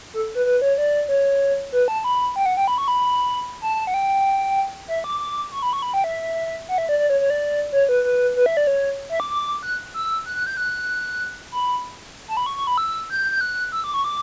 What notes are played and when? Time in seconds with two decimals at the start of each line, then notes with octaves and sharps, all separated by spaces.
0.14 A4
0.35 B4
0.46 B4
0.62 C#5
0.78 D5
1.08 C#5
1.72 B4
1.88 A5
2.04 B5
2.36 G5
2.46 F#5
2.57 G5
2.68 B5
2.78 C#6
2.88 B5
3.62 A5
3.87 F#5
3.94 G5
4.88 E5
5.04 D6
5.19 D6
5.52 C#6
5.62 B5
5.73 C#6
5.82 B5
5.94 G5
6.04 E5
6.69 F#5
6.78 E5
6.89 D5
6.99 D5
7.10 C#5
7.20 C#5
7.30 D5
7.72 C#5
7.89 B4
8.04 B4
8.36 B4
8.46 E5
8.57 D5
8.67 C#5
9.10 E5
9.20 D6
9.31 D6
9.63 F#6
9.94 E6
10.25 F#6
10.36 F#6
10.47 G6
10.57 F#6
11.52 B5
12.28 A5
12.37 B5
12.46 C#6
12.56 C#6
12.67 B5
12.78 E6
13.10 G6
13.32 G6
13.41 F#6
13.72 E6
13.84 D6
13.94 C#6
14.04 D6